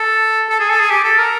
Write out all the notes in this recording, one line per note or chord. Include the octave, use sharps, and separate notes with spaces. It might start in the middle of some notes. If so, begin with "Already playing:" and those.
Already playing: A4
A4
G#4
A4
G#4
G4
A4
A#4